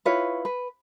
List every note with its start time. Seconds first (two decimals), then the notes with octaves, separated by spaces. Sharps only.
0.05 E4 F4 B4 C#5
0.45 B4